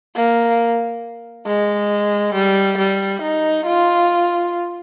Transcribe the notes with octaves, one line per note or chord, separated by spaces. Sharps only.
A#3
G#3
G3
G3
D#4
F4